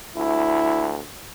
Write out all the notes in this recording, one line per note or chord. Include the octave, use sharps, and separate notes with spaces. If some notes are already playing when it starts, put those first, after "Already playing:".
D2 E4